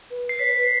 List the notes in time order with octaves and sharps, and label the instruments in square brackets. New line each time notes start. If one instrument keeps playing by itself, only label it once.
[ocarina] B4
[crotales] C7
[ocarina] B4 C#5 [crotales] B6